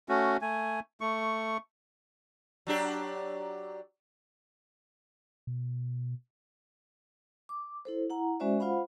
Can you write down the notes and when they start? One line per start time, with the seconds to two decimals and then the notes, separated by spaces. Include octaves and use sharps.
0.09 A3 C#4 F#4
0.42 A3 G#5
1.01 A3 C#6
2.67 F#3 D4 G4
5.47 B2
7.49 D6
7.85 E4 A4 C5
8.10 E4 F#5 A#5
8.40 G#3 C#4 F#4 C5 D5 E5
8.60 F4 C5 F5 F#5 B5